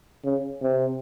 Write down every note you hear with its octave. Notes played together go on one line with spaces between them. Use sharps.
C#3
C3